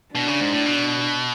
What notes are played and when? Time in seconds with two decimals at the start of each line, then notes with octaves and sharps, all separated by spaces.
0.15 B2 D4
0.28 C#3
0.41 G#2
0.53 A2
0.66 B2